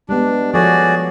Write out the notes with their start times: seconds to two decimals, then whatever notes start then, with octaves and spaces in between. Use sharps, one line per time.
0.09 G3 G#3 B3 D4
0.54 F3 F#4 G#4 A4 C#5 D5